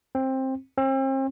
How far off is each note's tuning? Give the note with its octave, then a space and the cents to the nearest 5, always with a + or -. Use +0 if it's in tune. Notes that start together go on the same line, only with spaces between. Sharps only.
C4 +15
C4 +40